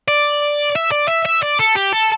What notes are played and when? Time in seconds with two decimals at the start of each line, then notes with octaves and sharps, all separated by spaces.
0.08 D5
0.76 E5
0.91 D5
1.08 E5
1.25 E5
1.43 D5
1.59 A4
1.76 G4
1.93 A4